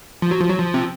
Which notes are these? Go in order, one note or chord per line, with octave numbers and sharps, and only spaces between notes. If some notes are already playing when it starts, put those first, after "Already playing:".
F3
F#3
F3
F#3
F3
C3